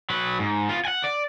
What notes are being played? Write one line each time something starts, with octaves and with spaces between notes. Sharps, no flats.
F#3 B4
G#2
B3 F4
F#5 G#5
D5